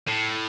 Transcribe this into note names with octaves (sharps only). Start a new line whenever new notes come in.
A2